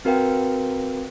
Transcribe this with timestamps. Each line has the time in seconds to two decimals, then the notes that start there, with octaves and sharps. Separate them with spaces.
0.05 C4 F#4 A#4 B4 F5 G5